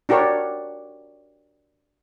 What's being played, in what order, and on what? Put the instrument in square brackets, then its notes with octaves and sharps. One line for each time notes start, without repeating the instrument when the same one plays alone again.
[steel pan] D4 F#4 G4 A#4 C#5